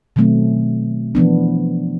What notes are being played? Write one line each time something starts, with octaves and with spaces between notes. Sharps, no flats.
B2 D#3 F#3 A3 C4
E3 F3 B3 D4